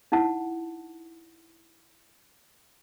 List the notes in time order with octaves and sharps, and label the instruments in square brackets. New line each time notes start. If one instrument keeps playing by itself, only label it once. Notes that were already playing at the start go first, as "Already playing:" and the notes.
[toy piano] D#4 E4 F#5 A5